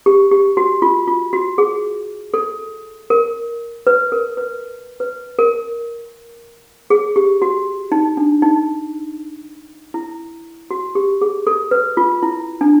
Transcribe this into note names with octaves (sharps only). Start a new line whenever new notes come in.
G4
G4
F#4
F4
F4
F#4
G#4
A4
A#4
B4
A#4
B4
B4
A#4
G#4
G4
F#4
D#4
D4
D#4
E4
F#4
G4
G#4
A4
B4
F4
E4
D4